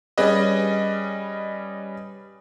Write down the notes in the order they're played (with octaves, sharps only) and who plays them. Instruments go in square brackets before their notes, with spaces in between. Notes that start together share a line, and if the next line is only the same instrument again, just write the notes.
[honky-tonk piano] G3 C#4 G#4 B4 D#5